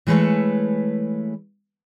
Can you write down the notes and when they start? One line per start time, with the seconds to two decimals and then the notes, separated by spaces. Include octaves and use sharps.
0.07 E3 G#3 A3 B4 C#5 A5